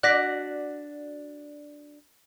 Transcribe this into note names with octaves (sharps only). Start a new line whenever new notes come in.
D4 F#4 D5 F#6 A#6 B6